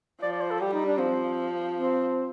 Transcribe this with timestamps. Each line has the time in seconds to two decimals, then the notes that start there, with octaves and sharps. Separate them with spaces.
0.21 F3 D5
0.32 D5
0.41 C5
0.51 A4
0.60 G3 G4
0.73 D#4
0.85 D4
0.97 F3 C4
1.74 C4